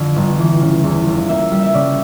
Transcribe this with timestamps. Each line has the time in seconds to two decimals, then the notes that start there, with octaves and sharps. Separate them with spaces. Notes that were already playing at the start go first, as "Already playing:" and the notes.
Already playing: F2 D3
0.16 G1
0.38 E3
0.61 C#3
0.84 E2
1.07 F1
1.29 A#3 E5
1.51 G3
1.63 E5
1.74 C#3 D5